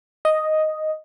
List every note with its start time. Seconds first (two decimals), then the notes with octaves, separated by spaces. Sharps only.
0.25 D#5